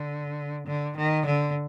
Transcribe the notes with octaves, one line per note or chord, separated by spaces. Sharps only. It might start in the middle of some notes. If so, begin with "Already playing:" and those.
Already playing: D3
D3
D#3
D3